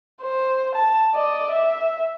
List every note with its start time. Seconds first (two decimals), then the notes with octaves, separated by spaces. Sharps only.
0.21 C5
0.75 A5
1.14 D5 D#5
1.51 E5